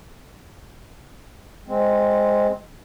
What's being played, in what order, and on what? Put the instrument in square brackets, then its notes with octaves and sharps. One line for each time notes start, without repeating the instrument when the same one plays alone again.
[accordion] G#3 C4